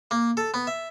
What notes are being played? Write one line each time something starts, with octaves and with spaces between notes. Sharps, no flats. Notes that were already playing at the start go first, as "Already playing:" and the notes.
A#3
A4
B3
E5